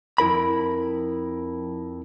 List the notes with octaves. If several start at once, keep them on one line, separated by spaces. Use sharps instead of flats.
F2 E4 A#4 B5